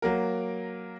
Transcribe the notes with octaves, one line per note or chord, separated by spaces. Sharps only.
F#3 A#3 A#4